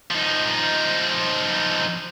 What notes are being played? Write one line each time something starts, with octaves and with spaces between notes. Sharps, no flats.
F3 D#4